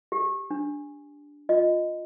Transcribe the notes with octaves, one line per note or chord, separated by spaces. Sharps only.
G4
D4
F4 D#5